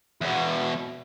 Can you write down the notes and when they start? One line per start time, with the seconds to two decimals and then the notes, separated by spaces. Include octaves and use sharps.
0.21 E2 B2